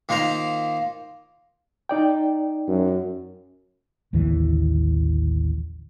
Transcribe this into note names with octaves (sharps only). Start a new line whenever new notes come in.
D#3 A#3 F4 C5 A#5
D#4 D5 G5
F#2
A1 D#2 D3 E3